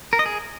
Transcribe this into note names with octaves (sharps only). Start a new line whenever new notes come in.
A#4
D#5
G#4